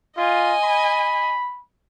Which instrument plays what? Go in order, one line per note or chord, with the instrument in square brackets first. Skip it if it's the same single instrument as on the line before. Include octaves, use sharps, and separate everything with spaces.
[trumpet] F4 [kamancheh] D#5 G#5
[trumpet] B5